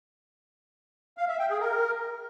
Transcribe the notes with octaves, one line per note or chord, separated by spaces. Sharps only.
F5
E5
G5
G#4
A#4